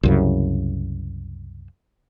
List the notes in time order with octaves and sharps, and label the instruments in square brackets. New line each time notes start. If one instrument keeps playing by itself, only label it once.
[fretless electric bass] C2 F#2 C#3